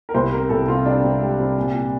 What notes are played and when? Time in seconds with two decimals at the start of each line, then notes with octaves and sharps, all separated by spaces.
0.09 A#4
0.14 C2 C5
0.32 C3 A#4
0.49 C2 A4
0.67 C3 F4
0.86 C3 D4
1.03 C3
1.21 G3
1.38 C3
1.57 A#2
1.74 A#2